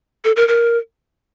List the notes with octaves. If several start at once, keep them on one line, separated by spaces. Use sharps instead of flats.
A4
A#4
A#4